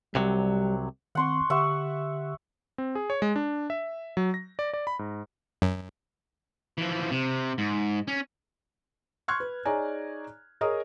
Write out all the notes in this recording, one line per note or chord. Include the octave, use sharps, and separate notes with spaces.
C2 C3 F#3 G3
D#3 C4 F#5 C6 C#6
D3 G4 E5 F#5 C#6
C4
G#4
C#5
G#3
D4
E5
F#3
A#6
D5
D5
B5
G#2
F#2
E3 F3
C3
G#2
C#4
C6 C#6 F6 F#6 G#6
B4
D#4 G#4 C#5 D5 G#5 A#5
G#4 A#4 C#5 D#5 A#5 D#6